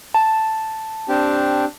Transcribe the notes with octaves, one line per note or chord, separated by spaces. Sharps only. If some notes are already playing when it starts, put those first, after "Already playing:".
A5
C4 D4 G4